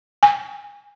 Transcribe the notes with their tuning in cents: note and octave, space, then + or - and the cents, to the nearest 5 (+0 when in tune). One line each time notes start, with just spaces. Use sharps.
G#5 -25